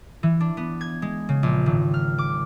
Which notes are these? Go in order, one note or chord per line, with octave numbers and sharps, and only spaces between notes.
E3
D4
B3
G#6
G#3
C#3
A#1
G#1
F6
D6